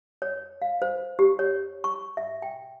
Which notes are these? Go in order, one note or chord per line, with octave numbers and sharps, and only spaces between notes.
C#5
F5
C5
G4
C#5
C#6
E5
G5